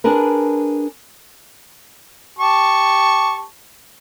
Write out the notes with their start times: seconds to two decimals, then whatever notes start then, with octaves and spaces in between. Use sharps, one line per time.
0.04 D4 G#4 A#4 B4
2.39 G4 A5 C#6